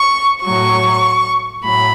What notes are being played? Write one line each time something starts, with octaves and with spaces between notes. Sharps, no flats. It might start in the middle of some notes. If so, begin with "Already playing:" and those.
Already playing: C#6
A2 F#3 C#6
A2 F#3 B5